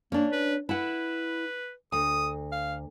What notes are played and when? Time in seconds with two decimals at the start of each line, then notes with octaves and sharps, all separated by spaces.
0.12 A#3 C#4 D4
0.32 B4
0.69 E4 B4 F#5
1.92 D2 D#6
2.52 F5